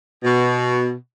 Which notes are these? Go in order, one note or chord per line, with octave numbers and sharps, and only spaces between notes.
B2